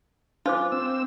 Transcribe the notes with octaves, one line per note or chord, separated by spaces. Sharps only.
D4 F4 C5 D6
C4 E6